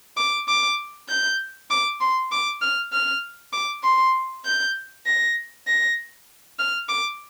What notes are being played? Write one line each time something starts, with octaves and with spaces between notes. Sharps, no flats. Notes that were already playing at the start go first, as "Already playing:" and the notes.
D6
D6
G6
D6
C6
D6
F6
F6
D6
C6
G6
A#6
A#6
F6
D6